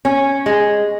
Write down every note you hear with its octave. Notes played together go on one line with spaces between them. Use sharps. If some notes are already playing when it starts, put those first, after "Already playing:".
C#4
G#3